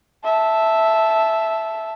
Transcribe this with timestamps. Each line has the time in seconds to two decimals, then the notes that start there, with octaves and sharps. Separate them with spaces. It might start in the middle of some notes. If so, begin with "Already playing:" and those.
0.24 E5 A5